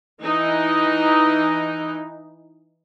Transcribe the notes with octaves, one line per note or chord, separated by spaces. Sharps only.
E3 D#4